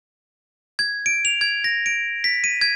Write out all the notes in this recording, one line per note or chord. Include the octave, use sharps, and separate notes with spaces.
G#6
D7
F7
G#6
A#6
D7
B6
D#7
G#6